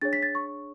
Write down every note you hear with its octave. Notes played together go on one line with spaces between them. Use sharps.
D4 G#4 C#5 A6
B6
A6
C#6